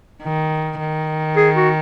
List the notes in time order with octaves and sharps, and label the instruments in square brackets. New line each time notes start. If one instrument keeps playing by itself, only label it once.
[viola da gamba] D#3
D#3
[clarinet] G#4
F#4